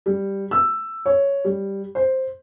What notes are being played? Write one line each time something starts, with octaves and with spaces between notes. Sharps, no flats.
G3
E6
C#5
G3
C5